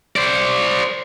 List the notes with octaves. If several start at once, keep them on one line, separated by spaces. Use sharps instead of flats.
C5 D5